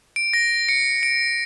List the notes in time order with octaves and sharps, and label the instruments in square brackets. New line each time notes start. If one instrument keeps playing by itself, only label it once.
[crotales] D7
A#6
C#7
D7